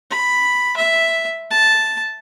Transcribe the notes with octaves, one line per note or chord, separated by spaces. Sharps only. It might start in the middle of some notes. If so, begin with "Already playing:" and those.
B5
E5
A5